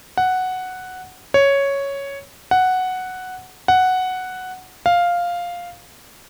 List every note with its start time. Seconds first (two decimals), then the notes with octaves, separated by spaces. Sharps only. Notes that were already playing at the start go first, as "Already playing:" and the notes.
0.17 F#5
1.34 C#5
2.51 F#5
3.68 F#5
4.86 F5